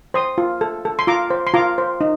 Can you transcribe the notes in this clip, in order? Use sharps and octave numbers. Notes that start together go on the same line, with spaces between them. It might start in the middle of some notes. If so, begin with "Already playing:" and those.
C5 C6 D#6
F4
A4
A4
C6
F4 A#5 D6
C5
C6
F4 A#5 D6
C5
D#4